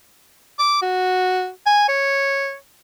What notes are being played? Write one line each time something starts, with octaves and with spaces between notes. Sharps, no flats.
D6
F#4
G#5
C#5